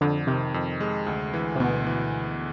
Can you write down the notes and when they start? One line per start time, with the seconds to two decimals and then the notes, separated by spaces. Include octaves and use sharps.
0.01 F2 D3
0.27 C3 D#3
0.54 F2
0.80 G#3
1.07 D2
1.33 E3
1.55 C3
1.60 D2 B2
1.87 E3